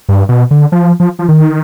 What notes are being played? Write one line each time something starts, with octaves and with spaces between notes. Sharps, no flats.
G2
B2
D3
F3
F3
F3
D#3